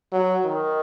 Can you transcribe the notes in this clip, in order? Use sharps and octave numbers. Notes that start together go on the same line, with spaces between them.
F#3
D#3